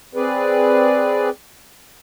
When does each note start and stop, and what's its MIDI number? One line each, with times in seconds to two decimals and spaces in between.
0.15 1.30 60
0.15 1.30 68
0.15 1.30 71
0.15 1.30 74